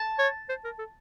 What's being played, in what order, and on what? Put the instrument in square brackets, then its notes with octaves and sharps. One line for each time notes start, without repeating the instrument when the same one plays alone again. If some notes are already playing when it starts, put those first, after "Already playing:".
Already playing: [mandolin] A5
[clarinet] C#5
C5
A#4
A4